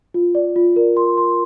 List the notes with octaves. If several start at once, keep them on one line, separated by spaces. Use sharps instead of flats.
F4
D5
F4
A#4
C6
C6